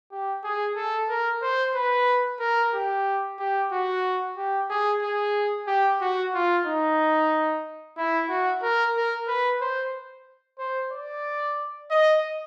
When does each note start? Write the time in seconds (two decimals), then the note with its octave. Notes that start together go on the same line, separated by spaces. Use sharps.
0.11 G4
0.44 G#4
0.76 A4
1.09 A#4
1.42 C5
1.74 B4
2.40 A#4
2.73 G4
3.39 G4
3.72 F#4
4.37 G4
4.70 G#4
5.02 G#4
5.67 G4
6.01 F#4
6.34 F4
6.67 D#4
7.97 E4
8.29 F#4
8.62 A#4
8.96 A#4
9.28 B4
9.61 C5
10.59 C5
10.92 D5
11.91 D#5